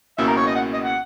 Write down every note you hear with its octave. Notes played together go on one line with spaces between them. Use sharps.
C#2 B2 A#3 C#4 E4 E5
A#4
C#5
D#5
F#5
D#5
F#5